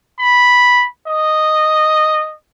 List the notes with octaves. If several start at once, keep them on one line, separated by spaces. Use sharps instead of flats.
B5
D#5